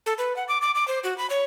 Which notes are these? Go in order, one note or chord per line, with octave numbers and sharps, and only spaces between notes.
A4
B4
F#5
D6
D6
D6
C5
F#4
B5
C#5